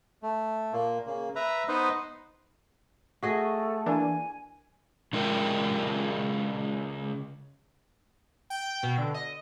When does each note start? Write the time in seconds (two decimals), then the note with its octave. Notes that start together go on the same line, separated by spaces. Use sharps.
0.23 A3
0.73 A#2 A#3
1.07 C#3 A#3
1.36 B4 E5 A#5
1.68 B3 D#4 B4 C5 D#5
3.23 A3 F#4 G#4 D#5
3.86 E3 A#3 D4 G#5
5.13 C#3 G#3 F4 A#4 G5
8.50 G5
8.83 B2
8.98 D3
9.14 D#5